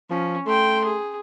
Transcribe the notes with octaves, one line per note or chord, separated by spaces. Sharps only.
F3 C#4
A3 G5 C6
G#4